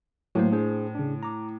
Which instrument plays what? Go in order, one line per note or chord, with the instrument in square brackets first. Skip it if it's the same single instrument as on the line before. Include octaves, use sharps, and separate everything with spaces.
[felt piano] A2 [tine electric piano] F#3 A#3 C5
[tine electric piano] D4 G#4 C5
C#3 D4
A#5 D6